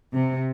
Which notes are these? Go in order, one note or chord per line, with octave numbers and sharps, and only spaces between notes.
C3